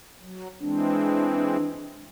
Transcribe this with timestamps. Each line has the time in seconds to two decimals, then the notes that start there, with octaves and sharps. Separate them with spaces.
0.21 F#3
0.61 E3 G#3 C4 D4